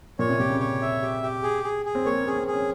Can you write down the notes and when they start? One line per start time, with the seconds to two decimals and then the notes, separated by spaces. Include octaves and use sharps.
0.19 A#2 C#5
0.29 C3
0.39 A#2 G4
0.50 C#3
0.60 C#5
0.82 E5
1.02 G4
1.23 G4
1.43 G#4
1.64 G#4
1.85 G#4
1.95 C4
2.06 A#3 C#5
2.21 C#4
2.27 G#4
2.36 C4
2.47 G#4
2.52 C#4